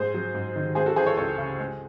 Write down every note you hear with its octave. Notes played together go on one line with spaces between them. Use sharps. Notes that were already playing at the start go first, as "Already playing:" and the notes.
Already playing: G#2 G#4 C5
F#3
G#2
D#3
G#3 G#4 C5
F#4 A4
E3 G#4 C5
A4 C#5
C#2 A4 C#5
C#3
G#3